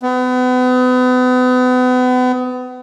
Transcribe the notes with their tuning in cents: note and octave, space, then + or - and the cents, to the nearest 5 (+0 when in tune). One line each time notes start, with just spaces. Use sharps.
B3 +35